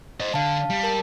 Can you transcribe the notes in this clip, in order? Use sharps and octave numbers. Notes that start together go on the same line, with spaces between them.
C5 D#5
D3 F5 A5
G3
A#4 A5